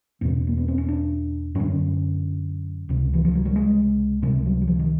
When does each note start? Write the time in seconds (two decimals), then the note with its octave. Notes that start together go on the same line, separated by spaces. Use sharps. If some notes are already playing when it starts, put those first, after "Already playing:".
0.21 E2 B2 C4
0.47 A#3
0.57 B3
0.68 C4
0.78 C#4
0.89 D4
1.55 F#2 D3 C#4
2.89 C#2 C3
3.14 E3
3.25 F3
3.35 F#3
3.45 G3
3.56 G#3
4.23 C#2 C3 G3
4.45 F#3
4.62 F#3
4.68 F3
4.79 D#3